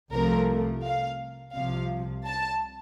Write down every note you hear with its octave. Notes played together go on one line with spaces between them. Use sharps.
C2 C3 F3 A3 A#4
F5
C2 C3 F3 F5
A5